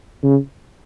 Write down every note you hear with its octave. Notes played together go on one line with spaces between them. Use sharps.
C#3